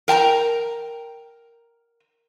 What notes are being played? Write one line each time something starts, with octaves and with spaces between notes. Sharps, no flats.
A#4 G5 A5 A#5